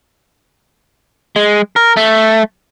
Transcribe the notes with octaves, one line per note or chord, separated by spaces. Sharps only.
G#3
A#4
A3